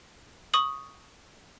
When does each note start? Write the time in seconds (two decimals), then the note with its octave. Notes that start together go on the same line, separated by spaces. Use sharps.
0.54 C#6 D#6 F#7